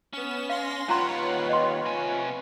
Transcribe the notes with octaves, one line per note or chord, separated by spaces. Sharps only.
B3 C#4 E7
F5 C6 A#6
D#2 C#4 F4 B4 C#5 F#5 A#5 C6
D#5 C6
C3 G#5